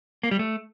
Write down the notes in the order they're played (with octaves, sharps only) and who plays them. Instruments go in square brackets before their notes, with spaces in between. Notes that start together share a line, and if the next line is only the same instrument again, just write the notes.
[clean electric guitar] A#3
G3
A3